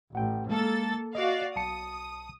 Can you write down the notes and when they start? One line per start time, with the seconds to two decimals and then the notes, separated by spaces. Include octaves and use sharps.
0.15 A1 F#5 G5
0.49 G#3 A#3 A4 A6
1.15 F#4 D5 D#5 F5
1.56 B1 A5 D#6 C#7